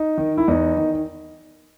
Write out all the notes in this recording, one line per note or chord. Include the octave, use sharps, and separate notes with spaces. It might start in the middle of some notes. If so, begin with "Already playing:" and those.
Already playing: D#4
D#3
E4
E2 D#4
D#3